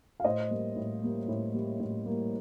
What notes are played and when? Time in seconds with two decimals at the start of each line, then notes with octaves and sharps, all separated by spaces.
0.20 F5
0.24 A2 C5 D#5
0.50 G3 A#3
0.76 A2
1.02 G3 A#3
1.28 A2
1.54 G3 A#3
1.80 A2
2.06 G3 A#3